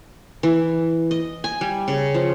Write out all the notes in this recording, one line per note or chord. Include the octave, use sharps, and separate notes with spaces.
E3
D#5
G#5
G3
C#3
F3